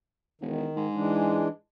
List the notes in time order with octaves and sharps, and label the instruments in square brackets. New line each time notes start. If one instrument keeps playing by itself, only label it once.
[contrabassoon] E1 [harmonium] D#3
[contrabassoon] G#2
[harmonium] E3 G#3 D4